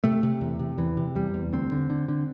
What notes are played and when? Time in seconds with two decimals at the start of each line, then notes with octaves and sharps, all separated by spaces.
0.04 C3 A3
0.23 C3
0.41 E2
0.59 C3
0.78 E2 E3
0.97 C3
1.15 E2 G3
1.34 E2
1.53 D2 C4
1.72 D3
1.90 D3
2.08 D3